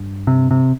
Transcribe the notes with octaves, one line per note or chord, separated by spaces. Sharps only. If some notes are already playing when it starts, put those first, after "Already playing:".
Already playing: G2
C3
C3